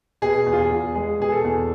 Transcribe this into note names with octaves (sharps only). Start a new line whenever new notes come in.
B2 G#4
E2
F4
G#4
E2
G#3 G#4
B2 G#4
A4
E2